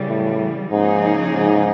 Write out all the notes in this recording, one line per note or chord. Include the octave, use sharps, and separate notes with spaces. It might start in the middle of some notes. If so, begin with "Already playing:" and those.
Already playing: C#3 E3 G3
A2
G#2 C#3 F3 A#3 D#4 G#4
G#2